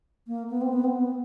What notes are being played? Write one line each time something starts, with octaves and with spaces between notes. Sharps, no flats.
A#3
B3
C4
B3
C4
B3